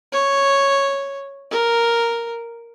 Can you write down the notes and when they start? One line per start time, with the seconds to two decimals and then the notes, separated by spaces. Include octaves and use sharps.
0.12 C#5
1.51 A#4